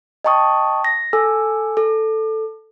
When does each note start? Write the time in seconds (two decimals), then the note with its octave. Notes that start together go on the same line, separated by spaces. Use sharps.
0.24 D#5 G5 A5 C#6 D#6
0.85 A#6
1.13 A4 G#5 E6
1.77 A4